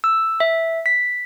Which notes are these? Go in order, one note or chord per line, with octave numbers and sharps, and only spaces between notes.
E6
E5
B6